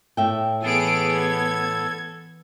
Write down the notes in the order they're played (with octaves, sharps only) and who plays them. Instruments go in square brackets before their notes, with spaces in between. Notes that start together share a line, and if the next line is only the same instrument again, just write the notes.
[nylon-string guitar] A2 E5 G5
[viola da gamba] E3 B3 [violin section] G#4 D7 [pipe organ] A4
[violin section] G#6